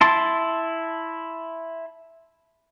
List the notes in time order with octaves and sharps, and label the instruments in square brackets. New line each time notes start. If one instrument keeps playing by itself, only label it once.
[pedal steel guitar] E4 A5 C6